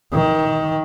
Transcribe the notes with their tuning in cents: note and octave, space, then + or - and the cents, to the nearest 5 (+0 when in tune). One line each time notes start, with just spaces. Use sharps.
D#3 +20